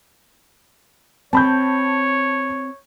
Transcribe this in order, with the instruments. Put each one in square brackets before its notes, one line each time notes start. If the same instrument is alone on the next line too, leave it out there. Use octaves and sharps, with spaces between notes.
[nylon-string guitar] C4 [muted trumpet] C#5 [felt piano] A5 B5 G6